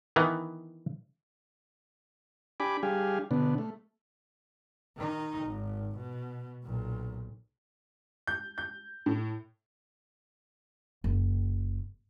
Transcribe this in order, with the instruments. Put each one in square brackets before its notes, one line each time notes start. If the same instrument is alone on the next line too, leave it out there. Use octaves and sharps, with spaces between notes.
[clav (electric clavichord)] D#3 E3 B3
[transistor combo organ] D4 G4 G#5 B5 D6
G3 D4 G4 G#4 F5 G#5
B2 D3 B3 D4
A3
[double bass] D#3 D#4
G#1
B2
B1 A#2
[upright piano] G6
G6
A2
[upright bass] F#1